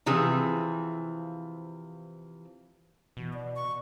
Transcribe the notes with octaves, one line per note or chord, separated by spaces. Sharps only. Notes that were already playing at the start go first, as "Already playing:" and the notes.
C3 E3 F3 G#4
B2 E3
D5
C#6